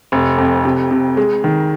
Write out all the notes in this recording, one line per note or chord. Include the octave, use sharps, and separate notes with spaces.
F1
F2
C3
C3
G#3
D#3